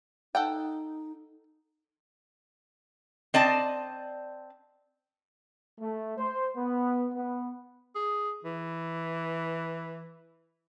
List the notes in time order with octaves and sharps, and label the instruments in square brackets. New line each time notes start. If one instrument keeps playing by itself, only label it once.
[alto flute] D#4 [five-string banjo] A4 F#5 G5
[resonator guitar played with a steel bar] C4 D5 D#5 A5
[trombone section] A3
C5
B3
B3
[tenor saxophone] G#4
E3